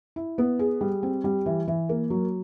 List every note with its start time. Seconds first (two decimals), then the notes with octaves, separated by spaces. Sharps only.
0.16 E4
0.38 B3
0.59 G#4
0.81 G3
1.03 C4
1.24 G3
1.46 E3
1.68 E3
1.89 A#3
2.10 F#3